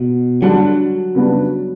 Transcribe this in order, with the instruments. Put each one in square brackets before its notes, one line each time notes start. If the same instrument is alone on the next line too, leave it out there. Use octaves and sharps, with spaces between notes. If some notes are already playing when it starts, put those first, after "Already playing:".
Already playing: [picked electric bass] B2
[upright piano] D3 G3 D4 F#4 [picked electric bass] F#3
[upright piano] C#3 G3 B3 D4 F#4